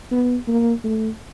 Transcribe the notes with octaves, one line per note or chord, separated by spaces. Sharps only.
B3
A#3
A3